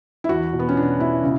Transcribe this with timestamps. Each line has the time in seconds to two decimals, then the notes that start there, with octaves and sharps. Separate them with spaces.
0.24 E4
0.29 E2 F#4
0.53 B2
0.59 B3
0.69 C#4
0.77 B2 D4
0.99 B2 E4
1.24 C#3